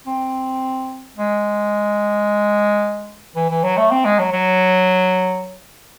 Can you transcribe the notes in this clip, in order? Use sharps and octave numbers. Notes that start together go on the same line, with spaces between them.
C4
G#3
E3
E3
F#3
A3
C4
G#3
F#3
F#3